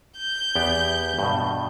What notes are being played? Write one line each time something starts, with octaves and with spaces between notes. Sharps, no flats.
G6
E2 B3 G4
G2 B2